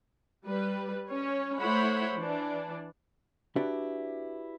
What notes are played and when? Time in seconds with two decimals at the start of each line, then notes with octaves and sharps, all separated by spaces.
0.46 G3 B4
1.08 C#4 C#5
1.58 A3 E4 C5 C#5 F#5 B5
2.17 E3 D4
3.56 D4 E4 F#4 G4 B4 D5